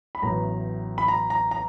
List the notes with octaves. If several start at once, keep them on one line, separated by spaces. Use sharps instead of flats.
B5
A1 A2 F#3 B3 A#5
B5
A#5
A#5
A#5